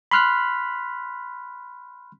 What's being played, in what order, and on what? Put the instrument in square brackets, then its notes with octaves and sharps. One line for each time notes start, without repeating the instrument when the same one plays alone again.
[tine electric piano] B5 C6 F6 F#6 B6